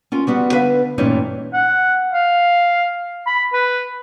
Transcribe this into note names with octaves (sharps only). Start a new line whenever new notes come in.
C#4 F4 A#4
G3 B3 F#4
D3 B4 E5 F5
G2 A#2 E3 A3 C#4 D#4
F#5
F5
B5
B4